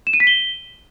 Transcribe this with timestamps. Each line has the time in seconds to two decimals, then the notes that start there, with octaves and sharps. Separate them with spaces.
0.07 E7
0.13 D#7
0.20 B6
0.27 G7